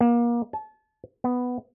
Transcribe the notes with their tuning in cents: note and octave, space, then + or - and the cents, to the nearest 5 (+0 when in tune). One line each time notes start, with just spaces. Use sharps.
A#3 +30
A5 -30
B3 +5